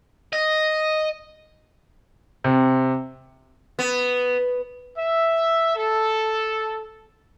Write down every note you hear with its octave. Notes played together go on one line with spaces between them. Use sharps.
D#5
C3
B3
E5
A4